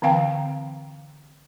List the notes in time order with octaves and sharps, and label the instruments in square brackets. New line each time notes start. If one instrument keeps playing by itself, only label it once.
[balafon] D3 E3 C4 F5 G5 A#5